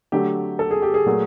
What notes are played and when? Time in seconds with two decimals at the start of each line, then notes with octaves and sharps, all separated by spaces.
0.12 D3 F#3 A3 G4
0.59 A4
0.71 G#4
0.82 G4
0.94 G#4
1.06 A#2 F#3 A3